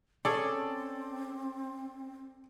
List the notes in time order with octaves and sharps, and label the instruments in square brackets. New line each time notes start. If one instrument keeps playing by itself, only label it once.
[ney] C4 [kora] C#4 G#4 C#5 [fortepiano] A4 D5